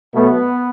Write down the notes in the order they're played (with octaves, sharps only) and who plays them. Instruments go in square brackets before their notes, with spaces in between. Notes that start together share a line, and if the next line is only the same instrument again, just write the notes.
[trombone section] B2 F#3 A3 B3